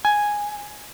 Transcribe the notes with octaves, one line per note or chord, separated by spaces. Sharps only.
G#5